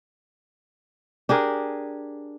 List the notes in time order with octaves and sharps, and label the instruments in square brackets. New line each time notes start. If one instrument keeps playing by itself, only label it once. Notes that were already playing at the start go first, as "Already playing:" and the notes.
[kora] D4 G4 G#4 A#4